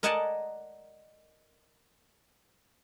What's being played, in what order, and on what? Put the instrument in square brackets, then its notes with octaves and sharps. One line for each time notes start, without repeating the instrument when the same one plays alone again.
[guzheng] A#4 D5 D#5 F#5 G#5 A5